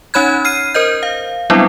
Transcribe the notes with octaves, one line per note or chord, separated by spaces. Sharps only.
C#4 D#4 C#5 B5 F#6 G#6
F6 C7 D#7
A#4 C5 D#5 G6
F5
F#3 G3 B3 C4 D4 E4